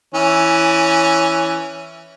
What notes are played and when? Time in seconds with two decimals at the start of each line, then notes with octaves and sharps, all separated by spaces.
0.14 E3 C#4